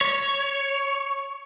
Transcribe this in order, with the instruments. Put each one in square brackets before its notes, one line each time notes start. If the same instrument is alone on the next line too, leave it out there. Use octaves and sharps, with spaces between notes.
[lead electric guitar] C#5